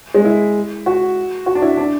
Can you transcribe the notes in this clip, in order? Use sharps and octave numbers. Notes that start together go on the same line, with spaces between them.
G#3
E4
F#4
F#4
D4
E4
D4